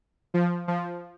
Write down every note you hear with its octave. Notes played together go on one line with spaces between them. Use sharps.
F3
F3